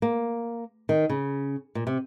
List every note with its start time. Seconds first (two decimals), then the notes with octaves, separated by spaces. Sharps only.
0.02 A#3
0.89 D#3
1.10 C#3
1.75 A#2
1.87 C3